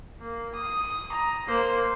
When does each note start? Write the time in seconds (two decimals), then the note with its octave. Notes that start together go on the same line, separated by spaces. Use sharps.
0.20 A#3
0.55 D#6
1.12 A#5
1.46 A#3 C5